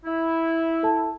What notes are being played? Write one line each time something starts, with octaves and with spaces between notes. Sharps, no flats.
E4
A4 A5